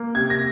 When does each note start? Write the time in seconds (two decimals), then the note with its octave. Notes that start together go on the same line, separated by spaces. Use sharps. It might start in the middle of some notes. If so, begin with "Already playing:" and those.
Already playing: A#3
0.15 C3 G#6
0.30 A#6